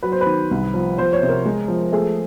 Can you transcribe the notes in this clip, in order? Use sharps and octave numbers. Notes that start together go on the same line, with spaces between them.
F#3 B4
C5
B4
D#3
C2
F3
F3 C5
C#5
C3
A#4
G#3
F3
A3 G#4